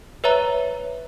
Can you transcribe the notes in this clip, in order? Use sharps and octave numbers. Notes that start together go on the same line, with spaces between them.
B4 C#5 E5 A#5